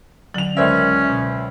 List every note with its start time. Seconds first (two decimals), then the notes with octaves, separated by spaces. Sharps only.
0.34 D3 F#3 F7 F#7
0.57 C#2 C#4 A#4 C5 D5 E5
1.09 B2